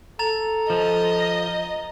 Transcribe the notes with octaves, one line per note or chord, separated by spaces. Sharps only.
A4 A#5 A6 F7
F3 D#5